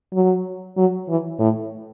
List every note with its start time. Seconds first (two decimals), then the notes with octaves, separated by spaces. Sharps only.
0.13 F#3
0.77 F#3
1.09 E3
1.39 A2